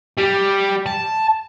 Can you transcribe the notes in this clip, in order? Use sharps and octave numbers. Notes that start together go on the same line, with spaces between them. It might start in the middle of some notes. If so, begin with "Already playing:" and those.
G3
A5